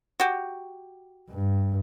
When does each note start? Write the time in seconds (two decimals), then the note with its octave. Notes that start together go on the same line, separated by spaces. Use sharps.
0.20 F#4 G4
1.30 G2